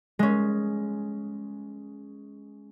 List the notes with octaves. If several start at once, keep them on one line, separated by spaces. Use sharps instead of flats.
G#3 C#4